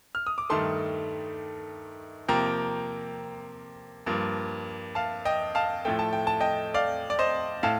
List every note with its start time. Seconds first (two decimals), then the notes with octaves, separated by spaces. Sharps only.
0.15 F6
0.27 D#6
0.38 D6
0.50 G2 D#3 A3 A5 C6
2.28 C3 F3 A#3 G5 A#5
4.06 G2 F3 A#3
4.95 F5 A5
5.25 D#5 G5
5.55 F5 A5
5.85 A2 F3 A3 G5
5.99 A5
6.13 G5
6.27 A5
6.40 D#5 G5
6.74 D5 F5
7.10 D5
7.19 C5 D#5
7.63 A2 F5 A5